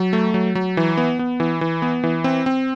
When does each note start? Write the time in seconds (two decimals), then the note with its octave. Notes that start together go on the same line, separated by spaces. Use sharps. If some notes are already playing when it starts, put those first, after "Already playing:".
Already playing: F#3
0.13 A3
0.34 F#3
0.55 F#3
0.77 E3
0.97 B3
1.19 B3
1.40 E3
1.61 E3
1.82 B3
2.04 E3
2.24 C4
2.46 C4